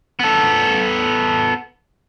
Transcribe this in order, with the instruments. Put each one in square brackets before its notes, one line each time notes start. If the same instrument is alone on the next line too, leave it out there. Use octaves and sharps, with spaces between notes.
[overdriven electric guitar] B3 A4